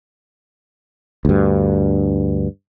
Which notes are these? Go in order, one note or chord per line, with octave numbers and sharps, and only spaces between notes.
D2 G2